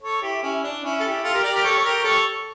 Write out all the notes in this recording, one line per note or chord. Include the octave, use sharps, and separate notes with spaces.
A4 C#5
E4 G4
C#4 E4
D4
C#4 E4
A4
E4 G4
F4 A4
G4 A#4
A#4 D5
G4 A#4
A4 C#5
C#5
G4 A#4
A4 C#5